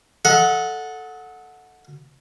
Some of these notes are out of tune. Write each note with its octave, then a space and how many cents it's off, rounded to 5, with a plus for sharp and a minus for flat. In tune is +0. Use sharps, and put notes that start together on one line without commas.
A4 +0 D#5 +40 F#5 -15